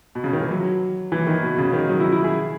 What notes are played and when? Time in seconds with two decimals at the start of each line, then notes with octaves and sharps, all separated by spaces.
0.15 B2
0.24 C#3
0.33 D#3
0.41 E3
0.51 F#3
1.12 E3
1.27 D#3
1.43 B2
1.58 C#3
1.73 D#3
1.89 F#3
2.00 E4
2.12 E4
2.24 G#4